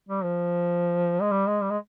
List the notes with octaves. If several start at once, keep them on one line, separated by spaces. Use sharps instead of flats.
G3
F3
G#3
G3
G#3
G3
G#3